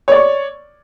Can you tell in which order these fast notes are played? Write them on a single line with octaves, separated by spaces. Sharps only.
C#5 D5 C#6